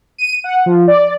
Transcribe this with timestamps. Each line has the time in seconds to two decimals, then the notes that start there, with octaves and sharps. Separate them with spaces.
0.18 D#7
0.44 F#5
0.66 F3
0.88 D5